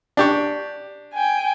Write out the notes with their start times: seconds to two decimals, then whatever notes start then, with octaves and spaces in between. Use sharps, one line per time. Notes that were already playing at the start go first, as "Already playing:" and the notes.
0.17 D4 G4 C#6
1.14 G5 G#5